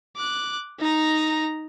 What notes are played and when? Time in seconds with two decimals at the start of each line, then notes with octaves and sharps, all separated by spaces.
0.17 D6 F#6
0.79 D#4 A#5